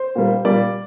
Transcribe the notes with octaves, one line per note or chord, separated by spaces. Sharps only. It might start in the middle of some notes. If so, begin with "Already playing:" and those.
Already playing: C5
A#2 G3 A#3
A#2 G3 A#3 D5